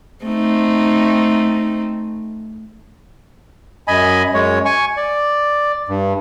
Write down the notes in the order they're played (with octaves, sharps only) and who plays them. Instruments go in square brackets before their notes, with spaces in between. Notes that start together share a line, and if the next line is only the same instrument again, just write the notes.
[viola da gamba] A3 C4 D#4
[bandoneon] F#2 D#5 G#5 B5
F#2 G#3 C#5
G#5 C#6
D5
G2